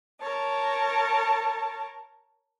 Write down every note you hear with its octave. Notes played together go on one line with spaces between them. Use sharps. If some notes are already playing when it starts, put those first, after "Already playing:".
A#4 C#5 A5